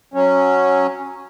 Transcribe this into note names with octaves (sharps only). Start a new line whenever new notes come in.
F#3 C#4